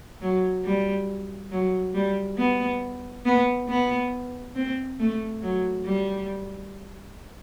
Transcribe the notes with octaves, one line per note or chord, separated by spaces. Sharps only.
F#3
G3
F#3
G3
B3
B3
B3
C4
A3
F#3
G3